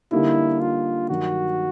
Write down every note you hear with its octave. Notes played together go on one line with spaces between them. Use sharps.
D3 G3 A#3 D#4 E4
F4
G2 D#3 F#3 F#4